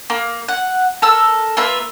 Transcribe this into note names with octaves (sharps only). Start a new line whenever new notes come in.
A#3
F#5
A4 A#4 E6
A#3 F4 B4 E5